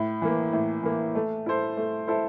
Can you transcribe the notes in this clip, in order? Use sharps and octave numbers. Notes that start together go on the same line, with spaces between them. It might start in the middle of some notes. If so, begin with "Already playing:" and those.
Already playing: A2
E3 A#3
A2
E3 A#3
A3
E4 A4 C5
A3
E4 A4 C5